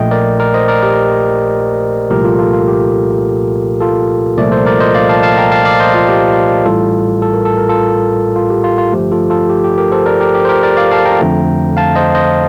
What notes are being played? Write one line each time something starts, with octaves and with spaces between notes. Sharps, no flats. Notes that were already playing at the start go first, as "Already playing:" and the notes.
Already playing: A#1 A#2 A3 D#5 G5
A#4 D5
A#4 D5
C5 D#5
A#4 D5
G4 A#4
C2 A#2 F3 A3 G4 A#4
F4 A4
F4 A4
F4
G4
F4 A4
C2 A#2 F3 A3 A#4 D5
A4 C5
A#4 D5
C5 D#5
D5 F5
F5 A5
F5 A5
G5 A#5
F5 A5
D5 F5
C5 D#5
F4
G4
A1 A2 G3 F4 A4
A4
A#4
A4
A#4
F4 A4
F4
G4
F4
F4
G1 G2 F3 A3 G4
F4 A4
F4 A4
G4
G4
G4 A#4
A4 C5
A#4 D5
G4 A#4
G4
C5
G4 A#4
A#4 D5
D5 F5
F5 A5
G5 A#5
F2 D3 F3 A3
F5 A5
C5 D#5
C5 D#5